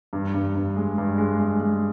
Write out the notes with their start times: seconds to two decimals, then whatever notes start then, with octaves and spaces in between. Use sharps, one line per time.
0.13 G2
0.34 G2
0.55 G2
0.76 G#3
0.98 G2
1.18 G#3
1.39 G#3
1.60 G#3